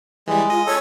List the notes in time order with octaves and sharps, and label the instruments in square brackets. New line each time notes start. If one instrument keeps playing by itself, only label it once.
[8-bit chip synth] E3 G3 [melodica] G#3
[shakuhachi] F4 [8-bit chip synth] D#5
[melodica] A4 [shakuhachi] C#5